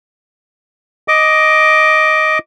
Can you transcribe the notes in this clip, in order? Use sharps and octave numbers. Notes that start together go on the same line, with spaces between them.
D#5 D6